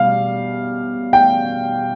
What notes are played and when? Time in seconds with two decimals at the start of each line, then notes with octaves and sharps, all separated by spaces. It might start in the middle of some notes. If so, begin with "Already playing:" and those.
Already playing: B2 G3 F5
1.13 G5